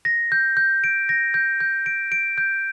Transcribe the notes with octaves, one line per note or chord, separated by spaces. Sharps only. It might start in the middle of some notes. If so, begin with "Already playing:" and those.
A#6
G6
G6
D7
A#6
G6
G6
D7
D7
G6